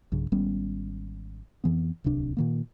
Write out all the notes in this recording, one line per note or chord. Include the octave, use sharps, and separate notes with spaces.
B1 G2 C#3
G#1 G3 B3 C#4
F2 E3 B3
D1 C2 C3 D4
A#2 D#3 A#3